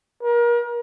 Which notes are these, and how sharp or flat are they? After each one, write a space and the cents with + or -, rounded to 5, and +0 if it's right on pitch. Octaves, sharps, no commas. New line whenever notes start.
A#4 +35